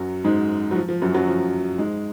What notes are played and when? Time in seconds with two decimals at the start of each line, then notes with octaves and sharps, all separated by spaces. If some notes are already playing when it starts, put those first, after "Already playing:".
Already playing: F#2 F#3
0.24 G#2 G#3
0.71 F#3
0.75 F3
0.89 F3
1.02 F#2 F#3
1.14 F#2 F#3
1.28 F3
1.78 G#2 G#3